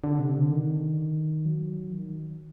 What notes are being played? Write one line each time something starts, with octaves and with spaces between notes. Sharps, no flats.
D3
C3
D3
D#3
F#3
D#3